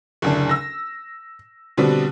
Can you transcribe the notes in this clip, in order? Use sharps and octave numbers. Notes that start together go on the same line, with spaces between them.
F#1 D2 D4
E6 A#6
B2 D3 G3 B3 C4 D4